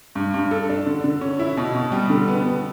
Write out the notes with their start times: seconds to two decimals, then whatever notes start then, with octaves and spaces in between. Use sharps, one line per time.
0.15 G2
0.34 G2
0.51 A4
0.69 D4
0.86 D3
1.04 D3
1.21 C#4
1.39 E4
1.57 B2
1.75 B2
1.92 G3
2.10 D3
2.28 B3
2.45 B3